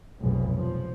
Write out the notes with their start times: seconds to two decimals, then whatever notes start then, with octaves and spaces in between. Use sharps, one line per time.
0.20 F1 B1 G#2 B2
0.55 F3